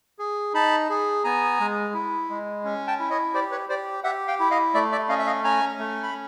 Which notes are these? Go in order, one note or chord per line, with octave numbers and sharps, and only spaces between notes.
G#4
D#4 A5 B5
G#4
B3 G#5 A#5
G#3
E4
G#3
C#4
G5 A5
E4
C#5 D#5
G4 C5 D5
B4 C#5
G4 C5 D5
G4 E5 F#5
F5 G5
E4
D#5 F5
A3 D5 E5
D5 E5
C#4 D#5 F5
E5
D#5 F5
C#4 G#5 A#5
A3
B5